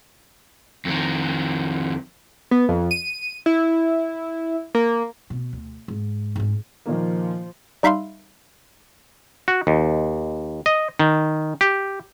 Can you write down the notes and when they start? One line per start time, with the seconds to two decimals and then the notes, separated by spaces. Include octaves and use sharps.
0.85 F2 D#3
2.51 B3
2.68 F2
2.91 D#7
3.46 E4
4.75 A#3
5.30 B2
5.53 D2
5.88 G#2
6.36 G#2 C#4
6.86 A#2 D#3 F3 A#3
7.83 G3 D#4 E5 F5 B5 C6
9.48 F#4
9.67 D#2
10.66 D#5
10.99 D#3
11.61 G4